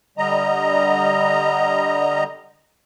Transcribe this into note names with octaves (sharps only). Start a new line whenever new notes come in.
D3 G3 D#5 A#5